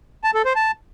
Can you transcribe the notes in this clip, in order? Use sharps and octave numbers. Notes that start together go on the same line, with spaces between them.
A5
A4
C5
A5